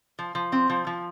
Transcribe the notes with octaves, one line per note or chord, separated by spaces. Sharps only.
F3
F3
C4
F3
F3